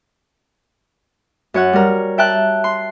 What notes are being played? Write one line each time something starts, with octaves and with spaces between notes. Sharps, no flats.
F#2 C#5 F#5
G3 A#4
E5 G5 A5 F#6
C6